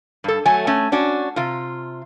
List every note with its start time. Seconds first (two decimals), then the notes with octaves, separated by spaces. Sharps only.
0.24 G2 A4
0.45 F#3 A3 G#5
0.67 A3 C#4
0.92 C#4 D4 F#4
1.36 C3 F4